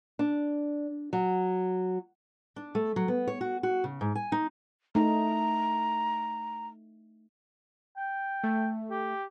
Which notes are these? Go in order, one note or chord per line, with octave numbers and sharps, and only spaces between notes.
D4
F#3
D4
A3
F#3
B3
C#5
F#4
F#4
C#3
G#2
G#5
D#4
A3 D#4 A#5
G5
A3
G4